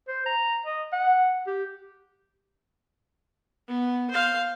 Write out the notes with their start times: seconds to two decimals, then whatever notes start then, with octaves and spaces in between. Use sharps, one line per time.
0.08 C5
0.26 A#5
0.66 D#5
0.93 F#5
1.47 G4
3.68 B3
4.10 C5 F5